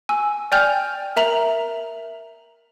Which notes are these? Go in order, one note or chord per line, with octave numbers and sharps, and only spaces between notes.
G#5 E6
D5 G5 G#5 F6 G6 F7
A#4 E5 A#5 F7 F#7